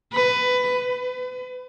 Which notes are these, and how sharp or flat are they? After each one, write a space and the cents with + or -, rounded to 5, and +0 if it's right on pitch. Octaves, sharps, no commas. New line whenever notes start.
B4 +15
B4 +35